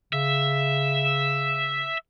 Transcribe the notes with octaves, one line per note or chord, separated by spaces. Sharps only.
C#3 E5